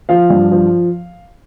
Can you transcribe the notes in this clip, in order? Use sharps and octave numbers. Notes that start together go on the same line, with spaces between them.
F3 F5
G2
F3